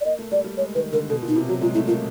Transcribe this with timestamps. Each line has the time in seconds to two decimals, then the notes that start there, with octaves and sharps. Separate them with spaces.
0.01 D5
0.05 A#3 D#5
0.19 A3
0.32 G3 D5
0.44 G3
0.57 G#3 C#5
0.75 D#3 B4
0.92 D3 A#4
1.10 B2 A4
1.22 A#2
1.28 D#4
1.36 C3 E4
1.48 F#3 F#4
1.61 G#3 F4
1.74 A3 E4
1.87 A#3 F4